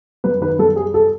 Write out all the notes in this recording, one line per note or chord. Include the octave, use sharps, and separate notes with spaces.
F#2 B4
D#3 B4
F#2 A4
G3 G#4
A4